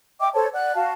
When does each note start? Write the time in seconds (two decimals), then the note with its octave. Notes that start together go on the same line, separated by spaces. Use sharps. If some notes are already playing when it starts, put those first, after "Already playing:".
0.20 D#5 E5 G5 D6
0.34 A4 C5 C#5 A5
0.53 D5 F#5 F#6
0.75 F#4 F5 A5